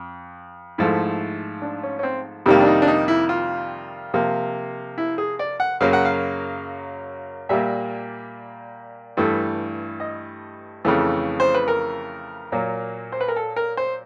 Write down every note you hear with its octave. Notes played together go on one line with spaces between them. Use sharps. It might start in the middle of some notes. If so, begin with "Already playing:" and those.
Already playing: F2
G#2 F3 A3 E4
D4
C#4
C#4
C4
F2 C3 D#3 G3 A#3
D4
D#4
D4
D#4
E4
F4
C3 F3 A#3
E4
G#4
D5
F#5
F#2 C#3 F#3 A#3 F5
F#5
F5
A#2 G3 A#3 E5
G2 E3 A3
D#5
F2 C#3 E3 A3
C5
B4
A#4
A#2 F#3 A#3
C5
B4
A#4
A4
A#4
C5